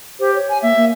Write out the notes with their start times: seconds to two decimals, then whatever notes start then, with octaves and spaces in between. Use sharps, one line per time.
0.20 G4 C5
0.34 C#5
0.49 G#5
0.62 A#3 E5
0.76 A#3